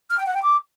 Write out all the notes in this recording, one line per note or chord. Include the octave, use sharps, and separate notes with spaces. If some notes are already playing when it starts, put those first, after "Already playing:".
F6
G5
F#5
G5
D6